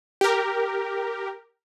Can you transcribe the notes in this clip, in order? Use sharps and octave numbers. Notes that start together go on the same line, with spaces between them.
G4 A#4